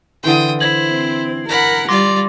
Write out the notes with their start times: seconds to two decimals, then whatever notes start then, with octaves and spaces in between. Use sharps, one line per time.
0.24 D3 E3 G5 C6 D#6
0.61 E4 C5 G#6 F#7
0.90 C4
1.48 A#4 F#5 B5
1.88 G3 F4 D5 C6 D6 A#6